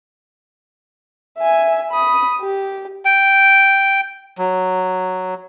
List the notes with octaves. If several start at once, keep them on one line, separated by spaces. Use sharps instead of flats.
E5 G#5
B5 D#6
G4
G5
F#3